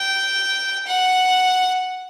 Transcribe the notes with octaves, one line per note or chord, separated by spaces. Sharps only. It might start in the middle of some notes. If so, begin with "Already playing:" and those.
Already playing: G5
F#5